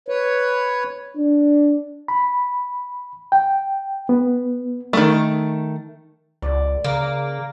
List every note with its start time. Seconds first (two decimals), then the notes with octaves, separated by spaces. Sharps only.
0.08 B4 C#5
1.17 D4
2.08 B5
3.32 G5
4.09 B3
4.93 D#3 A3
6.42 C#2 D5
6.84 C#3 A#3